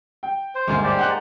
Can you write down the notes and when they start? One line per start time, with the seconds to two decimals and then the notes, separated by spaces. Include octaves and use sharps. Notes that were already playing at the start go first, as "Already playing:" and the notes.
0.23 G5
0.55 C5
0.68 G1 D2 G#2 G#3 A#3 F4
0.84 G4 C5 D5
0.99 D#4 F#5 F#6